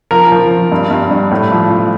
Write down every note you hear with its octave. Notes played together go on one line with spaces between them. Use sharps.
F3 A#4
F3
F3
G2
G2
G2
A2
F3
F3